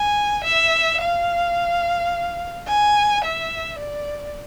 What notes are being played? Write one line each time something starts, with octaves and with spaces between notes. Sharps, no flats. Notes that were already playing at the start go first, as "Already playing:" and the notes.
Already playing: G#5
E5
F5
G#5
E5
D5